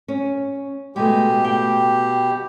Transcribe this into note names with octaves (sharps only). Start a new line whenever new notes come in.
C#4
B2 G#3 A3 G4
G5